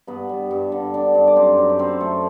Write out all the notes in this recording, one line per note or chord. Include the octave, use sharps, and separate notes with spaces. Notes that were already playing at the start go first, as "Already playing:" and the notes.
G2 B3 B4
G3
G2
D3
D4
G2
D5
F#2 C4 C5
F#2
B4
F#2 C4 C5
F#2 A3 A4